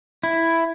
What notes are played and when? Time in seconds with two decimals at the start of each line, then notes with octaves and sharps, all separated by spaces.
0.23 E4